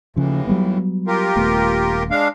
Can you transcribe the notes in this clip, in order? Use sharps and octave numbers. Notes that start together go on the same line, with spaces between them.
D#2 A2 C#3 E3 F3
F#3 G3 B3
F4 G4 A#4
D#1 A3 B3
G#3 D4 F5